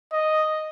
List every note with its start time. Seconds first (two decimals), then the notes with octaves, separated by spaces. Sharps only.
0.12 D#5